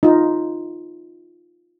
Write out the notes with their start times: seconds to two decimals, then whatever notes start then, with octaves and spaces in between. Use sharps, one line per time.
0.03 D#4 F4